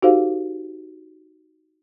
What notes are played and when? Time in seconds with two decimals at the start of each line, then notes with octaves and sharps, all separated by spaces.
0.02 D#4 F#4 G4 A4 C5 F5